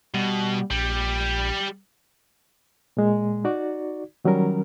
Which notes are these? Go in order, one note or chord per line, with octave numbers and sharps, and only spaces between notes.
B2 G3
A#1 G3
A#2 G#3
D#4 F#4 D5
D#3 F#3 G3 C#4 A#4